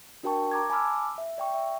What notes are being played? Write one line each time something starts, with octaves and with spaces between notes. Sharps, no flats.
D4 F#4 A#4 G5 A5 C#6
A#5 D6 G#6
G#5 A5 B5 D6 E6 F6
E5
D5 G5 C#6
E5